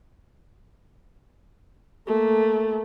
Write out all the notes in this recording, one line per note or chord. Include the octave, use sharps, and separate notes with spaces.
A3 A#3